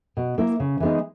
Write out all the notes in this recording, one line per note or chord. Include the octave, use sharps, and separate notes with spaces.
B2
A#3 E4 A#4
C#3
E3 G#3 B3 D#4